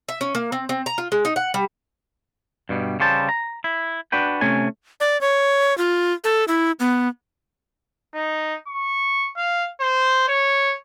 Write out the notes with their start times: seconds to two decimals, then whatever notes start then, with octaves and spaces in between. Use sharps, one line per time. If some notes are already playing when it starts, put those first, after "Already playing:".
0.09 E5
0.21 C#4
0.35 A#3
0.52 C4
0.69 C4
0.86 A#5
0.98 F4
1.12 G#3
1.25 D#4
1.36 F#5
1.54 G3
2.69 G2 B2 G3
3.00 C#3 G3 C5 A5
3.29 A#5
3.64 E4
4.12 D4 F#4 B4 G5
4.41 C3 A3 C#4 G#5
5.00 D5
5.21 C#5
5.78 F4
6.24 A4
6.48 E4
6.80 B3
8.14 D#4
8.68 C#6
9.36 F5
9.80 C5
10.28 C#5